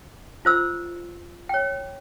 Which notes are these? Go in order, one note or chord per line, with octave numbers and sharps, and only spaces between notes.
F4 C5 E6
C#5 G5